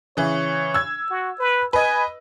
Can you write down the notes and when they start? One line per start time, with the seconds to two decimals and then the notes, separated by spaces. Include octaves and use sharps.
0.17 C#3 E3 C#5
0.74 E6 G#6
1.11 F#4
1.39 B4
1.73 B4 D#5 G#5